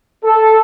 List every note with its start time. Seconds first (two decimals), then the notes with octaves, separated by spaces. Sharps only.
0.24 A4